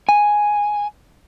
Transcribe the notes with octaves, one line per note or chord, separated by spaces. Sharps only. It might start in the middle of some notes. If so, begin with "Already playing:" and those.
G#5